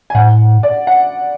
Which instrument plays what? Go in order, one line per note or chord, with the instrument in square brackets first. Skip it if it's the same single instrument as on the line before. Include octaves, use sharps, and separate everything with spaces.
[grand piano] G#5
[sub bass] A2 [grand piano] F#5
[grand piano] D5
F#5